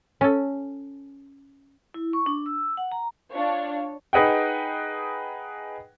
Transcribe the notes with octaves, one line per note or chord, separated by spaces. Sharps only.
C#4 A4
E4
C#6
D4
E6
F#5
A#5
D4 F4 C#5 F5
D#4 G#4 B4 D#5 F#5 G5